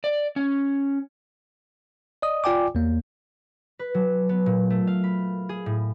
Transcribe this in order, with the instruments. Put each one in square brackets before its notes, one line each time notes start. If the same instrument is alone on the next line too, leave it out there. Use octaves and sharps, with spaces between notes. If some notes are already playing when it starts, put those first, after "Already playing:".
[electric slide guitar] D5
C#4
[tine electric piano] D5 D#5 D#6
F4 D5 G5 G#5 D6
E2 A#3
[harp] B4
F#3
B3
A#2
A3
F5
B5
G#4
A2